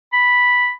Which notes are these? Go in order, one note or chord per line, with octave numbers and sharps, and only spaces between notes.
B5